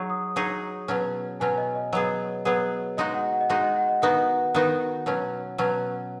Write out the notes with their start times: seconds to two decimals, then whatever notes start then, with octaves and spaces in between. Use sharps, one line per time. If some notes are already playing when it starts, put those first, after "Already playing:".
Already playing: F#3 D#4 G#4 C#6
0.10 D#6
0.36 F#3 D#4 G#4 C#6
0.88 B2 F#3 C#4
1.40 B2 F#3 C#4 G#5
1.58 D#5
1.75 D#5
1.93 F#3 B3 G#4
2.45 F#3 B3 G#4
2.97 G#3 D#4 F#4 D#5
3.14 F#5
3.32 F#5
3.41 D#5
3.49 G#3 D#4 F#4 F#5
3.63 D#5
3.76 F#5
3.89 D#5
4.02 D#3 B3 D#4 F#4 F#5
4.54 D#3 B3 D#4 F#4
5.06 B2 F#3 C#4
5.58 B2 F#3 C#4